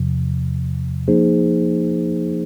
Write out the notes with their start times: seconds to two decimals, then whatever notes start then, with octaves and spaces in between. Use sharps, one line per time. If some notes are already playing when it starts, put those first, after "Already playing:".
Already playing: E2 C3 F3
1.08 F3 A#3 D#4 G#4 C5